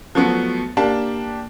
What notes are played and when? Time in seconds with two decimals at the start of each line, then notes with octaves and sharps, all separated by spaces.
0.15 F3 F#3 A3 B3 F#4
0.77 A#3 D4 G4 A5